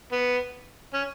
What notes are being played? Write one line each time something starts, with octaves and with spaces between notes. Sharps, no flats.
B3
C#4